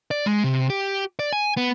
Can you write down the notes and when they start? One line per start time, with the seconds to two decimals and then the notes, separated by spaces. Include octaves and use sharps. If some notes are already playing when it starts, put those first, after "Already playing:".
0.11 D5
0.26 G#3
0.44 C3
0.70 G4
1.19 D5
1.33 G#5
1.57 B3